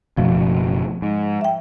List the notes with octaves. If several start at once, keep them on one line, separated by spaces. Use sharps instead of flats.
F#1 B2 F3 A3
G#2
E5 G5